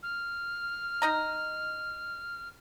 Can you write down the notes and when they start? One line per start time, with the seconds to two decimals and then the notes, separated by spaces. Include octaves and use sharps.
0.03 F6
1.02 D#4 D#5 A#5